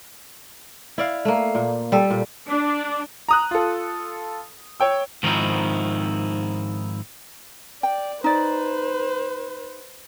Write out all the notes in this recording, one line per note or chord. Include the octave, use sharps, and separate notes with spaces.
E4 D5 F5
A3 A#3
A#2
G3 A4
A#2
D4
A#5 D#6 F#6
F4 A4
C#5 G5 E6
G#2 D#3 F3 C4 D#4 E4
D5 G5
D#4 B4 C5 D5